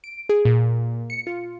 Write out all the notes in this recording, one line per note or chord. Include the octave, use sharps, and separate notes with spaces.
D7
G#4
A#2
C#7
F4